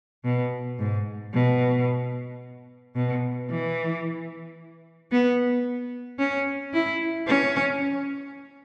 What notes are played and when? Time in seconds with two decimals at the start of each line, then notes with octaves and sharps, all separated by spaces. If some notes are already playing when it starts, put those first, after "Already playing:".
0.25 B2
0.79 G#2
1.33 B2
2.95 B2
3.49 E3
5.11 B3
6.19 C#4
6.74 E4
7.27 C#4